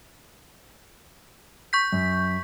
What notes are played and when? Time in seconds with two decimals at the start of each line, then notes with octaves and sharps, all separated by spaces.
1.73 C#6 G6 B6
1.92 F#2